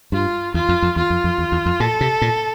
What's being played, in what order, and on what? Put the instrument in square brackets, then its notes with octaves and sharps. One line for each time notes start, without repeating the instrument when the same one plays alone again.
[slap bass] G2 [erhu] F4
[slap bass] E2 [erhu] F4
[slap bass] F2
F2
[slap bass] E2 [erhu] F4
[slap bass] F2
F2
E2
E2
F2
[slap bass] A#2 [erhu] A4
[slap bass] C3
A#2